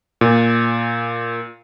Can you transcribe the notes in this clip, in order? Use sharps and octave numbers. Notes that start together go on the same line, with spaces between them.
A#2